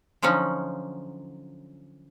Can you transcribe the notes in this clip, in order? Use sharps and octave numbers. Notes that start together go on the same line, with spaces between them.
D3 F3 F#3 C#4 D#4